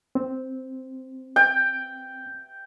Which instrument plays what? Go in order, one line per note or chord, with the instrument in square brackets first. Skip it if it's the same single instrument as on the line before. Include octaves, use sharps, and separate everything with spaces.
[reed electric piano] C4
[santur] G5